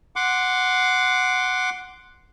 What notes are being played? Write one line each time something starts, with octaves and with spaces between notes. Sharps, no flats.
F#5 C6 D6